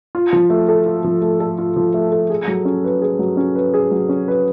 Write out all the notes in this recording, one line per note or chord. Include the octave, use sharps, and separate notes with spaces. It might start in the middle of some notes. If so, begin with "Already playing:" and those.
F4
F3
A3
A4
F4
F3
A3
A4
F4
F3
A3
A4
G#4
F#3
C#4
B4
G#4
F#3
C#4
B4
G#4
F#3
C#4
B4